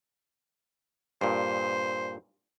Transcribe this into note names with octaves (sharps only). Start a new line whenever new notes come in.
G2 A#2 C5